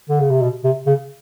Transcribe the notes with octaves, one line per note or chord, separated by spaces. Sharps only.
D3
C#3
C3
B2
C3
C#3